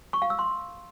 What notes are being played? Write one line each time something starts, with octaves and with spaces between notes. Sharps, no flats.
C#6
F5
E6
C6